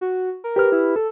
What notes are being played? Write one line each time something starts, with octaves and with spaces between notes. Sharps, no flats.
F#4
A#4
G4 B4 F6
E4
A4